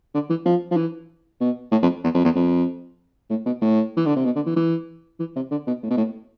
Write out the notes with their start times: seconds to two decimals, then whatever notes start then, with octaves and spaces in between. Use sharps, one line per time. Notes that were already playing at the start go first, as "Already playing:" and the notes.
0.14 D3
0.30 E3
0.45 F3
0.71 F3
0.76 E3
1.40 B2
1.72 A2
1.82 F2
2.03 E2
2.14 F2
2.24 E2
2.35 F2
3.30 A2
3.46 B2
3.61 A2
3.97 E3
4.06 D3
4.16 C3
4.25 B2
4.35 D3
4.46 E3
4.56 E3
5.19 E3
5.35 C3
5.51 D3
5.67 B2
5.83 A2
5.90 B2
5.97 A2